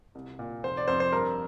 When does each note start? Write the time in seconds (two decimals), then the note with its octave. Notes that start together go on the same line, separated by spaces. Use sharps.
0.15 C2
0.39 A#2
0.63 F1 C5
0.77 D5
0.88 F2 C5
1.00 C5
1.12 G2 A#4